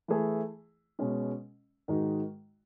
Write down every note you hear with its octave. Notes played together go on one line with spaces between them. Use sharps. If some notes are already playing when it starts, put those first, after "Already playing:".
E3 A3 E4 G#4
B2 G#3 C#4
G#2 D#3 G#3 D#4 F#4